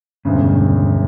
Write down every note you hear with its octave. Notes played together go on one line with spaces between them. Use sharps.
E1 D2 G2 C#3